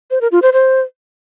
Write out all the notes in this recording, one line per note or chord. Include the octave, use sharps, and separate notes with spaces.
C5
A#4
F4
C5
C5